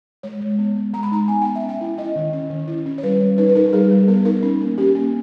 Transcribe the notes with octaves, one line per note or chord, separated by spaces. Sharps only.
G#3 C#5
G#3
B3
G#3
G#3 A#5
B5
D#4 A#5
B3 G#5
B3 G5
E5
C#4
G5
E4
E4 D#5
D#3
C#4
D#3
E4
C#4
C#5
G3 B4
G3
D#4 B4
B4
D#4 A#4
G3 G#4
G3
B3 A#4
D#4 A#4
C#4
A#3
C#4 G4
A#3